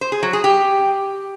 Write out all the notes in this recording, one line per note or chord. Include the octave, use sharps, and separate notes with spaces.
C5
G#4
F#3
G#4
G4